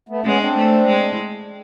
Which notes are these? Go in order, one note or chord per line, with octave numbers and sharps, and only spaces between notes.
A3 B3
G#3 B3 C#4
C4 D4
A3
G#3
E4